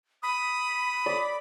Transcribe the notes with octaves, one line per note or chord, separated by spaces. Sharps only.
B5 D#6
D5